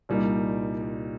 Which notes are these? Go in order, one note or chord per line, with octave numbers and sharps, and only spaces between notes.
C2 A#2 G3 A#3 D#4